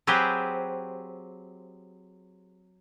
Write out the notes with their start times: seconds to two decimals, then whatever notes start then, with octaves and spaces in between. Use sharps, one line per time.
0.07 F#3 C4 G4 G#4 B4 C5